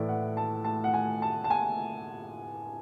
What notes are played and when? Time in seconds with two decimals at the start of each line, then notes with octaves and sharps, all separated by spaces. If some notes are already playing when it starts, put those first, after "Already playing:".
Already playing: A2 E3 A3 E4 D5
0.09 F#5
0.37 A5
0.64 A5
0.84 F#5
0.94 G#5
1.22 A5
1.44 A5
1.50 G#5